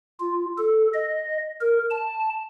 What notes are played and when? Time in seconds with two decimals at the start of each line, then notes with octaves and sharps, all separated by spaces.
0.19 F4
0.58 A4
0.93 D#5
1.61 A#4
1.91 A5